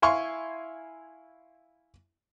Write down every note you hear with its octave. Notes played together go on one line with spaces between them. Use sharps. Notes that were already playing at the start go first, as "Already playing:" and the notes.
E4 F5 G#5 C6 C#6